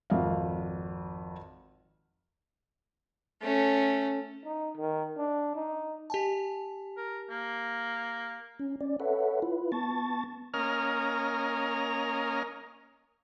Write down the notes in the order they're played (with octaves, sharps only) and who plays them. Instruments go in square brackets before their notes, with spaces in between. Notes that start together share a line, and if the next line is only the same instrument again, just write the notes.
[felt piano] G#1 F2 F5
[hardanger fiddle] A3 C#4
[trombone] D#4
D#3
D4
D#4
[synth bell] G4 G#5 A5
[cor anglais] A#4
A#3
[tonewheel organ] C#4
C#4 D5
A4 B4 C#5 E5 F#5
E4 F4 B4
B3 A5 C#6 A6
[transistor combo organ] A#3 C#4 A#4 D#5 F6